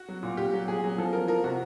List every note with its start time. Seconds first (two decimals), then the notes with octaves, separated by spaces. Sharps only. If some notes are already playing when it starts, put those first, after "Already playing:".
Already playing: F#4
0.09 F#3
0.23 A#2
0.37 A#2 G4
0.53 F#3
0.67 A#2 G#4
0.84 F#3
0.98 F3 A4
1.13 F3 A#4
1.28 F3 A#4
1.44 C3 F#4